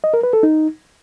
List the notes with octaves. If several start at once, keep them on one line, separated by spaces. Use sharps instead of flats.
D#5
A#4
B4
A4
D#4